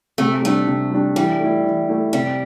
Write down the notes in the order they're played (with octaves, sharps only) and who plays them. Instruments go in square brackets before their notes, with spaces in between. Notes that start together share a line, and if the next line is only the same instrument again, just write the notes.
[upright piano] C3 [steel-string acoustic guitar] A3
[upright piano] G3 D4 [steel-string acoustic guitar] A3
[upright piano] C3
G3 D4
[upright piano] E3 [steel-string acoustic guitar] G3
[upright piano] A3 E4
E3
A3 E4
[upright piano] C3 [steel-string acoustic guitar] G3